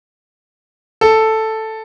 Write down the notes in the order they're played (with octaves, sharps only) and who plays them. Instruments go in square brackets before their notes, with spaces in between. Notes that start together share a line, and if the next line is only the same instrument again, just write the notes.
[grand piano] A4